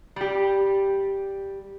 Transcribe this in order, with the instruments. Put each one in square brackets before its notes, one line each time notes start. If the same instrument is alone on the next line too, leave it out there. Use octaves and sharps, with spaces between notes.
[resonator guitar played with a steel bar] G3 G4